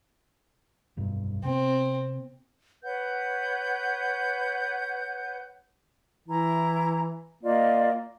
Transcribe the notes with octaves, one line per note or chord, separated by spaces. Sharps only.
F1 B1 G2
C3 B3 C4
B4 C#5 F#5 G6
E3 E4 A#5
A#3 F4 D5 D#5